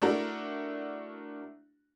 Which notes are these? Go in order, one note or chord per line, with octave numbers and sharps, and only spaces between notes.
A3 D4 E4 F#4 A#4